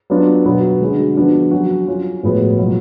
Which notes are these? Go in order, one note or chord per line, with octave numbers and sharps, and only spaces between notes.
F#3 B3 D4 F4
B2 F#3 B3 F#4
D3 G#3 C#4 F#4
F3 B3 D4 F#4
F#3 C#4 F#4
F#3 C#4 F4
A2 F3 G#3 B3 F#4
B2 F#3 B3 F4